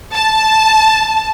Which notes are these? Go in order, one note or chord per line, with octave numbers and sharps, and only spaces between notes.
A5